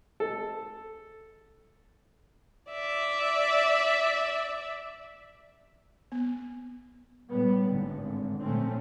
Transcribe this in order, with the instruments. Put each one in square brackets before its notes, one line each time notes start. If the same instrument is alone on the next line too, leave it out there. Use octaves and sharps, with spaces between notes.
[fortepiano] A4
[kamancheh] D5 E5
[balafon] B3
[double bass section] A2 G3 B3
G#1 A2 D3
A#1 D3 A3 C4 C#4